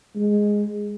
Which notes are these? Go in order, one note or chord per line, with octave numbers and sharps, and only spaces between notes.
G#3